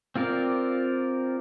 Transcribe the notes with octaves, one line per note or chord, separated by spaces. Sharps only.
C4 F4 A#4 D5